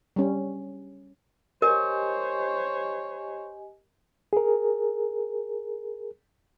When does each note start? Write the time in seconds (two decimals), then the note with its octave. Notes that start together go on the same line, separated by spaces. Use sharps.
0.16 G3 C#4
1.62 G4 A#4 C5 C#5 D#5 G#5
4.33 G#4 A#4